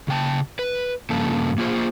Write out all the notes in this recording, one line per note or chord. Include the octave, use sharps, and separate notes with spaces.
C#3 G5 A5
B4
G2 C#3 F3 A#3 A4 A5
A#3 F4 G#4 C5